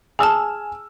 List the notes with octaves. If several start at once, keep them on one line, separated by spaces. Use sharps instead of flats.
G#4 G#5 A5 E6 F6